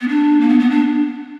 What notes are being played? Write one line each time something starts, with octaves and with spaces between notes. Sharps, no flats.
B3
D4
A#3
B3
B3
D4